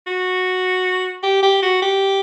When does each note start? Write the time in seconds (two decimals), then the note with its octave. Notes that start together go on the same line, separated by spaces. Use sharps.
0.07 F#4
1.23 G4
1.43 G4
1.62 F#4
1.82 G4